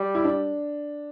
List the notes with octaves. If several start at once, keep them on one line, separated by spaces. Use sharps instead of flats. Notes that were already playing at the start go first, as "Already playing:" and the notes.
Already playing: G3
E4
D4